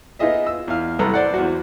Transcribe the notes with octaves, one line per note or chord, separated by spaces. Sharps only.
B3 D#4 F4 G#4 D#5 E5
E6
E2 F5
C2 F#2 A4 B4 A#5
C5 D5 F#5
E2 F#4